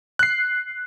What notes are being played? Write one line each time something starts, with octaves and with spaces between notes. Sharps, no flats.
F#6 C7